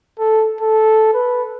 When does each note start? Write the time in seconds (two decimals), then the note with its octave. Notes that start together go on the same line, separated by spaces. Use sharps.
0.19 A4
0.61 A4
1.14 B4